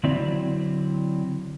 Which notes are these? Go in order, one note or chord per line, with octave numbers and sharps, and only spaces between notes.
D3 F#3 C4 E4 D5